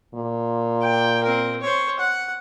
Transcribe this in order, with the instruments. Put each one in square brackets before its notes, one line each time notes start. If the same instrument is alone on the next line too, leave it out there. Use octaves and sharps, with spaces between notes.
[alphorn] A#2
[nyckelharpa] G5
C4 A#4
C5 C#5
F#5